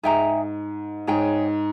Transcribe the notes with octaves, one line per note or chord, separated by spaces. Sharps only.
G#2 G#4 E5 G5 A#5
G#2 G#4 C#5 G5